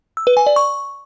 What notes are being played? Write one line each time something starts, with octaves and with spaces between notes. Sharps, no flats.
E6
B4
G#5
D5
C#6